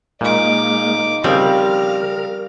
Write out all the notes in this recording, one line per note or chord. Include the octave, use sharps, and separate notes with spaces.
A#2 G#3 A#3 D#4 D6
C#3 F3 G3 C4 A#4 F5